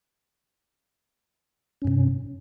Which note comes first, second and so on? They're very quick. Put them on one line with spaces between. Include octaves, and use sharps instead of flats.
C#4 G2 C3